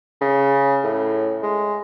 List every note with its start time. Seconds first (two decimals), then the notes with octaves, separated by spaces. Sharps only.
0.21 C#3
0.84 A2
1.43 G#3